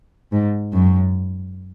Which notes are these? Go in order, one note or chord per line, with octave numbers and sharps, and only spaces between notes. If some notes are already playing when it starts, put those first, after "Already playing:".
G#2
F#2